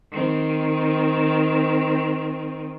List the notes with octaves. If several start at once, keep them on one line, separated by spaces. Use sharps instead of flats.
D#3 C4